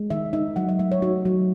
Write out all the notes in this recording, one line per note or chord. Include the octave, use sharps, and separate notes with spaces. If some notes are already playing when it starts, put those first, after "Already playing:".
Already playing: G#3
D#3 E5
D#4 E5
F#3 F#5
E5
A3 E5
C#5
D#4 F#4
F#3